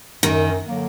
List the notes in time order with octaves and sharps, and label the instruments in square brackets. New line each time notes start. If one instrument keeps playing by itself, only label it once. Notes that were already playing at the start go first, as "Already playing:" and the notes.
[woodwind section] F#2 [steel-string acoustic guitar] D#3
[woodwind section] D3 F#3 A#3